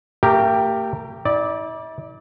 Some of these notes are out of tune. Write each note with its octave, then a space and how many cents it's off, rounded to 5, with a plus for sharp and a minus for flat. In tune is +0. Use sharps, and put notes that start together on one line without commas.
A3 +35 G4 +0 A#4 +0
E4 -45 D5 +0